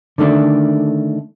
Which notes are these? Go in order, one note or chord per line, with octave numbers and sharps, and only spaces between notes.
D3 D#3 A3 D4